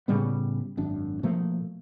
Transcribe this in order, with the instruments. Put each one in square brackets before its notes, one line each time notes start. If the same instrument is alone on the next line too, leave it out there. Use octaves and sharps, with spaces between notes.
[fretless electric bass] A2 C#3 G3 B3
G#1 F#2 D4
B2 F3 A3 A#3